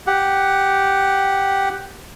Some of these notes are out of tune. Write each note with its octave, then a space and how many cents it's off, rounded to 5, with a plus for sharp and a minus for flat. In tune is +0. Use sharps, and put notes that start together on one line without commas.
G4 +0 F#5 +10